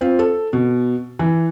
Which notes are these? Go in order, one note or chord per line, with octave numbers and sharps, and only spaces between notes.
C4 F4
A4
B2
E3